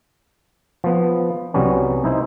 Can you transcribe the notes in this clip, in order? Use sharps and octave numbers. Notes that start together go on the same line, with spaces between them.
F3 B3
C2 F#3 G3 B3 C#4
D#4 E4 C5